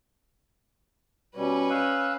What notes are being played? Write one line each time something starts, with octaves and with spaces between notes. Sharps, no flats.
B2 G3 C#4 B4
F5 E6 F#6